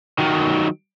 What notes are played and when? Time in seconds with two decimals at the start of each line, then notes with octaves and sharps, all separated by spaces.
0.19 D#3 F#3